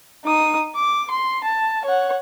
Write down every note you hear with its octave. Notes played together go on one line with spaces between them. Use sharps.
D#4 D#6
D6
C6
A5
C#5 F#5